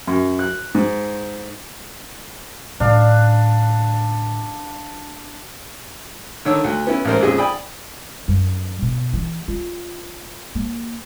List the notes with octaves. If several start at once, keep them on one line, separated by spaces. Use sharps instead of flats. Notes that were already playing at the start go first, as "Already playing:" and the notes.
F#2
F#6
G#2
A2 D3 D4 F5
D3 D#3 C#5 E6
D2
B3 C#4 E4
A1 G#2 A#4 C5
A#1 F2 G#3 C#4 G#4
D5 G5 G#5 B5 D#6
F#2
B2
E3
F4
A#3